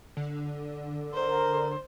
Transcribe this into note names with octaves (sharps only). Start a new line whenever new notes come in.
D3
A#4 C5